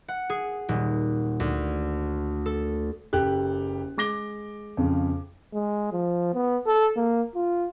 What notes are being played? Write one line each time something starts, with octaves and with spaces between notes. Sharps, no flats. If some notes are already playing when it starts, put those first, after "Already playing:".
F#5
G#4
D#1
D2
A4
F#1 G4 A4 F#6
G#3 D6 A#6 G7
F2 C#3
G#3
F3
B3
A4
A#3
F4